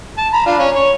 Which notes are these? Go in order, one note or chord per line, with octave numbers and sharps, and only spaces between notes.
A5
A#5 B5
D4 F4
C#4
C#5